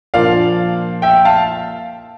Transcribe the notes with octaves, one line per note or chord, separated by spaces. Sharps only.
A#2 F3 A#3 D4 F4 D5 F5
E5 G5
F5 A5